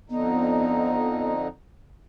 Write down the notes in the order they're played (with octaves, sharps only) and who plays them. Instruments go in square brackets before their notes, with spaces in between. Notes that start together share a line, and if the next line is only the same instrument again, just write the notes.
[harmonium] F2 D3 D#4 [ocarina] B3